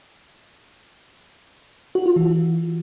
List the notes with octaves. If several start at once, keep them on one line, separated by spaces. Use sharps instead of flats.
F#4
F4
E3